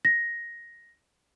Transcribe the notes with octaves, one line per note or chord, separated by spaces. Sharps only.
A#6